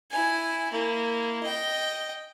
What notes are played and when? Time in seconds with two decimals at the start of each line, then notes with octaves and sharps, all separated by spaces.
0.11 E4 G#5
0.72 A#3 E4
1.43 D#5 G5